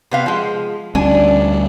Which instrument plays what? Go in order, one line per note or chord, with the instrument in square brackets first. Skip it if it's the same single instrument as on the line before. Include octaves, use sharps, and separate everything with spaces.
[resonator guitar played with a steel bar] C3 B3 F5
F3 G#3
[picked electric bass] D2 G3 C#4 [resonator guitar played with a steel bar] D4 G#5